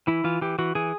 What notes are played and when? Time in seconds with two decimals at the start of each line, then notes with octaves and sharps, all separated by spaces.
0.07 E3 E4
0.24 E3 F4
0.41 E3 G4
0.58 E3 F#4
0.75 E3 G#4